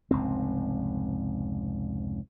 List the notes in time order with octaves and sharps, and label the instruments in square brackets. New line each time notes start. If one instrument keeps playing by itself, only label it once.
[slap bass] F1 C#2 G#2 C4